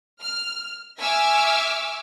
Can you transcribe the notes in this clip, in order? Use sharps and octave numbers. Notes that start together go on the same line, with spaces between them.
F6
E5 G#5 C#6 D6 E6 F6